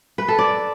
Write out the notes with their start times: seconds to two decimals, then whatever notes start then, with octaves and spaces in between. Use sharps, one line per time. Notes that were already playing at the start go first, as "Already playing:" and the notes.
0.18 B4
0.28 A4
0.39 D5